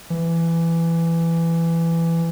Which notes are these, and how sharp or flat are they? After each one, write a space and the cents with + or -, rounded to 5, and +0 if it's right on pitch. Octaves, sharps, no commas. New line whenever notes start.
E3 +15